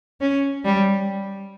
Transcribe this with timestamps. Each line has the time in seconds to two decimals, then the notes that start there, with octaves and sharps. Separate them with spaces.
0.21 C#4
0.65 G3